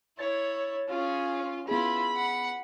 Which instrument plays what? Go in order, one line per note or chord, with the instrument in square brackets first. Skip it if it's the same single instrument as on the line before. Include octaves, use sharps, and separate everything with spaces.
[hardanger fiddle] E4 [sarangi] C#5 [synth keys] A6
[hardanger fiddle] C#4 G#4 [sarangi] F4
[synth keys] B3 G#4 [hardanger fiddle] E4 F4 [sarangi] B5
[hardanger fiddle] F#5